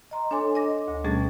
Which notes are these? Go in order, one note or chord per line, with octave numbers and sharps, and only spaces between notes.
D#5 A#5 C6
D4 A4 C#5 G#5 C6 D6
D4 D#5 D6 A#6
D2
B2 G3 A3 C#4 G#4 A6